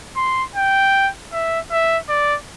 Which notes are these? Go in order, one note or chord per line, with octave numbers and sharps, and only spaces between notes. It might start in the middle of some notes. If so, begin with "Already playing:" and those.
C6
G5
E5
E5
D5